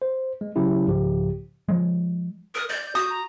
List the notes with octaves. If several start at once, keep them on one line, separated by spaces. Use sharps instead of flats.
C5
G#3
C#3 F#3 C#4 E4 G4
C2 G#2 C#3 F3 G4
F3 G#3
A#4 D#6
D5 G6
F#4 D#6 G6
A#5